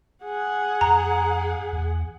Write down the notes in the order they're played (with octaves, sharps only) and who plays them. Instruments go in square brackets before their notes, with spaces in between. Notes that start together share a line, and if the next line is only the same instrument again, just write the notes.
[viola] G#4 F#5
[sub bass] F2 [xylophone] A#5
[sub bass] E2